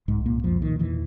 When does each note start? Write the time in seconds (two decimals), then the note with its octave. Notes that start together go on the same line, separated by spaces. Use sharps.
0.08 C2 G#2 G#3
0.26 A#2 A#3
0.44 F2 A#2 F3
0.62 D#3
0.79 E2 A#2 E3